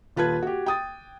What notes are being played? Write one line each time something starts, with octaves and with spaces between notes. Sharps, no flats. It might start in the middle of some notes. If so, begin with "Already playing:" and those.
D#1 F4 B4 A5 F#6 G#6
F#4 G4
G5 D#6 A6